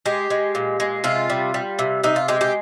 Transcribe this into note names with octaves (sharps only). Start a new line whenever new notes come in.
G#3 G4
G#3
A#2
G#3
C3 F4
G3
G3
C3
C3 D#4
F4
G#3 G4
G4